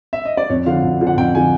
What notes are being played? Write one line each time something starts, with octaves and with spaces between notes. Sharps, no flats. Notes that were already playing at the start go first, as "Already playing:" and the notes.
E5
D#5
D5
F2 C#5
D3 F3 F5
F2
D3 F3
F#5
F2 G5
D3 F3 G#5